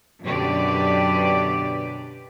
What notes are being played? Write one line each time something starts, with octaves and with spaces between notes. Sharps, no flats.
F#2 B2 D3 G4 B4 D5